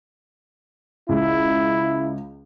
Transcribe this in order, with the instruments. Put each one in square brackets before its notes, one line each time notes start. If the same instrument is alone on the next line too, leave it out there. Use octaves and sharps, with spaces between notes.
[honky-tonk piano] C#2 [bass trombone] E4